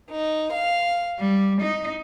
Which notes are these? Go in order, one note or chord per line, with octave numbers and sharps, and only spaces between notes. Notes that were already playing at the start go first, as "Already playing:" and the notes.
D#4
F5
G3
D#4